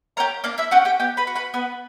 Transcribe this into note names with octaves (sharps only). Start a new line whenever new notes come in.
C#4 G4 A#4 A#5
A#3 D4 D5
E4 E5
C#4 F#4 G4 F#5
G4 G5
B3 G4 G5
B4 B5
F#4
B4 B5
B3 B4 B5